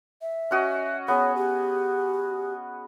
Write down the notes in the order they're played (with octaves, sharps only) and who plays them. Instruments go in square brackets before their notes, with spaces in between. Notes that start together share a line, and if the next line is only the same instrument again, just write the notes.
[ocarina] E5
[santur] C#4 F#4 D#5
[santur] B3 G#4 [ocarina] C#5
[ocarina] G4